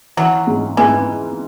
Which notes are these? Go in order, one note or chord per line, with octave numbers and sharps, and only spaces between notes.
E3 F#3
G#2
G#2 E3